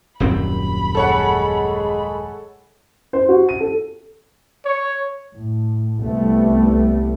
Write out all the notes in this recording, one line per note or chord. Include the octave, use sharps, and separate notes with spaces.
D#1 F#2 C4 B5
G#3 G#4 A4 C#5 F#5
C5
F#4
D#7
A4
C#5
A2
C2 G3 A3 B3